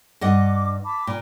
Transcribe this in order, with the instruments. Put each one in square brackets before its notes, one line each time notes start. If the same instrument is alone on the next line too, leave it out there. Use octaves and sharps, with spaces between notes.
[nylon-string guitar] G2 D#5 F#5 [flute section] D6
[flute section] A5 B5 D6
[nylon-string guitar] A#2 [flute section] G5